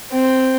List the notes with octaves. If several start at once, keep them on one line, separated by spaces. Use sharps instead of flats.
C4